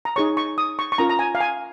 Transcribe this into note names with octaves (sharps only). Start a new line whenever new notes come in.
A#5
D#4 G#4 C#5 C#6
C#6
D#6
C#6
C#6
C#4 F4 A#4 A#5
A#5
G#5
F5
G#5